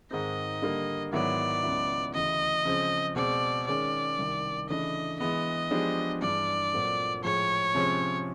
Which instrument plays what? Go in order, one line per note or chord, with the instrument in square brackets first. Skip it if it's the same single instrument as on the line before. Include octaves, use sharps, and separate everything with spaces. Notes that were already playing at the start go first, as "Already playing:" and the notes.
[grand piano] G#2 D#3 G#3 C4 D#4 [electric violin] D#5
[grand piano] D3 G3 A#3
[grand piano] G#2 D#3 F#3 B3 E4 [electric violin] D5
[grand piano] C#2 C#3 F#3 B3 E4
[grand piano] D2 C#3 E3 [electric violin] D#5
[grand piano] C#3 F3 G#3 C4
[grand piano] B2 G#3 C4 [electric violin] D5
[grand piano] D#3 G#3 C#4 [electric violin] D5
[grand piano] C2 C3 D#3
[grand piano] C#3 E3 A3 D4 [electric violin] D#5
[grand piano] E3 G#3 B3 [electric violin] D#5
[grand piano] F3 G#3 B3 D4 G4
[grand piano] G2 E3 G#3 [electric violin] D5
[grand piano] A#2 F#3 A3 C4
[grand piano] A2 F3 G#3 [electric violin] C#5
[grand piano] C3 F3 G#3 C#4